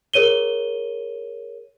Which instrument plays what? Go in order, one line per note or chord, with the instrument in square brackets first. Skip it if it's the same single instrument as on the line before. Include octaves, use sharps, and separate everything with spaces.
[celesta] G#4 A#4 C#5 D#7 G7